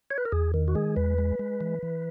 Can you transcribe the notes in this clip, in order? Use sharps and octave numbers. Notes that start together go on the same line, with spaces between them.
C#5
B4
A#4
E2 G#4
D#3
F#4
G#3 G#4
E2 B4
G#3
G#3
E3
E3